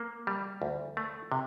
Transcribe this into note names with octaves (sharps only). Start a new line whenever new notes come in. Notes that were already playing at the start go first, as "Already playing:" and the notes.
Already playing: A#3
G3
D2
A3
C3